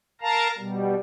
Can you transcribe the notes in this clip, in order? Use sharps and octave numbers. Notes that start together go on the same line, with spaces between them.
A#4 F5 A5 A#5
B2 G3